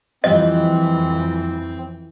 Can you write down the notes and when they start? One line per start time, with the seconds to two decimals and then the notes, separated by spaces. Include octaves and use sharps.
0.24 F2 E3 F3 G3 C4 D#5 F#5